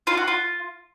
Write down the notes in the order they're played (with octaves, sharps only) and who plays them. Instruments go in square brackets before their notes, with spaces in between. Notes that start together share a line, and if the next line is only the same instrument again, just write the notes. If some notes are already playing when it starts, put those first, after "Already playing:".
[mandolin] F4
F#4
F4